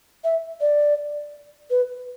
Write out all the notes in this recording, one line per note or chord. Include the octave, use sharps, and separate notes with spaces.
E5
D5
B4